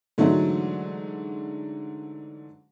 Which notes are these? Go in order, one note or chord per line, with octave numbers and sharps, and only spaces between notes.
G#2 D3 E3 F#3 G#3 A3